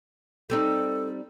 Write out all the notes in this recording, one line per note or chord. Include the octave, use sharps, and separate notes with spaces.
G3 C4 D#4 A4